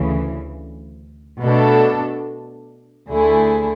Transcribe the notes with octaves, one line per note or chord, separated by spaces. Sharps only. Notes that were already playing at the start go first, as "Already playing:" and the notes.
Already playing: D2 C#3 E3
B2 A3 D4 A4
D2 D3 A3 E4 G#4